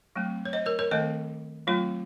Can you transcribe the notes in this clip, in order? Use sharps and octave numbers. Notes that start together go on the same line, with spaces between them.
F#3 A3 C4
C#5
C5 D#5
A#4 C#5
A#4 C#5
D#3 A3 C4 C5 D#5
F#3 A3 C4 F4